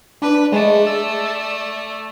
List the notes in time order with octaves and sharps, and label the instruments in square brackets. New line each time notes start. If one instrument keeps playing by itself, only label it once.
[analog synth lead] D4 [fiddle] B4
[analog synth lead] G#3 [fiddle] A3 D5
[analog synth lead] E6